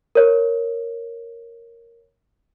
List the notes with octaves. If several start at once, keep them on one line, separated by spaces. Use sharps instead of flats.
A#4 C#5